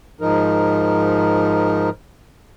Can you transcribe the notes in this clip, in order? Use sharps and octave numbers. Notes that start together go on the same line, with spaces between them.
G#2 F3 D#4 A#4